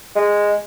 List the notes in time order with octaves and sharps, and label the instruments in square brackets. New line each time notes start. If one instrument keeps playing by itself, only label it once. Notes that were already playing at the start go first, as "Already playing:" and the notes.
[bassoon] G#3